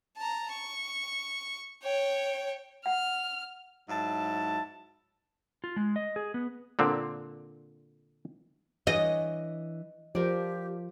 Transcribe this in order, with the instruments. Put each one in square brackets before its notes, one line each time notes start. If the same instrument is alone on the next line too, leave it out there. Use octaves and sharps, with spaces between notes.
[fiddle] A5 A#5
C#6
C#5 G5
[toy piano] F#5 [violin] F6
[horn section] G#2 F#3 E4 A5
[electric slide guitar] F4
G#3
D#5
G#4
B3
[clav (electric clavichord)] A#2 D3 C4
[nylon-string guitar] E3 D4 C#5 [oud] D#5
[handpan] F3 [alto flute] G4 [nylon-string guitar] A#4 C5 D5